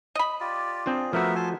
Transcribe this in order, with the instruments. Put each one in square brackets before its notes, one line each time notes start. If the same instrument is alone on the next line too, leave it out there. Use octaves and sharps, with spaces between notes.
[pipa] D#5 B5
[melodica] F4 G4 D5
[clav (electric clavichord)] C4 D4 F4 [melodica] G#4
[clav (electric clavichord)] F3 A3 F#4 [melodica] B3 A#4 E5
[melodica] G#5 A5 C6